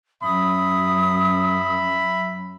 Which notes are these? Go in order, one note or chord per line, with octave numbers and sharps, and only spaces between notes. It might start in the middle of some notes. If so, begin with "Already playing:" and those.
F#2 F#3 E5 B5 D#6